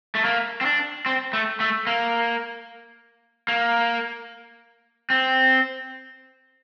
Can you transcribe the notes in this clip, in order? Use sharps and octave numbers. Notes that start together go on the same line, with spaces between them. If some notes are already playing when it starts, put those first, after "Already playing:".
A3
A#3
C4
D4
C4
A3
A3
A#3
A#3
C4